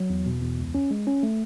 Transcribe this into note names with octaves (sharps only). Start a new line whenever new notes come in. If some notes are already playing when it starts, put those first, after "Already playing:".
Already playing: F#3
E2
B2
E2
C#2
C#4
G#3
C#4
A3